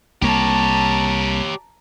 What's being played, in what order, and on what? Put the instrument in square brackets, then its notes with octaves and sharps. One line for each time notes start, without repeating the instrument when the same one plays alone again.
[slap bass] C2 A#3 [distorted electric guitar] G4 C#5 [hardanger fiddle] A5 A#5